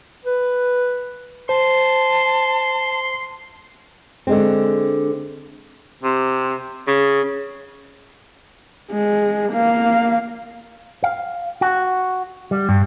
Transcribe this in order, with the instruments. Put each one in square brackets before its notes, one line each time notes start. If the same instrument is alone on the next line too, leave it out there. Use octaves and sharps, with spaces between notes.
[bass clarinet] B4
[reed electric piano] C5 [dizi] A5 [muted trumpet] C6
[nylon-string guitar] D3 G#3 C4
[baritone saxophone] C3
C#3
[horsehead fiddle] G#3
A#3 F5
[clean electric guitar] F5
F#4
G3
G2